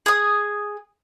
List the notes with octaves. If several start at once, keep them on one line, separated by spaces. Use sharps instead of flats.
G#4 D#6